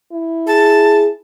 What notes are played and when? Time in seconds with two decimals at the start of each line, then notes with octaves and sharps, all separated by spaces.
0.12 E4
0.47 G#4 A5